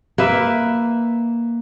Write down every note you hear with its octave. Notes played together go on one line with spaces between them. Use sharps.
A#3 B4 E5